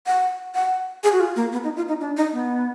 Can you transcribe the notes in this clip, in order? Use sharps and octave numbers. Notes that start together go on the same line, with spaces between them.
F#5
F#5
G#4
F#4
F4
A#3
B3
D#4
F4
D#4
D4
D#4
B3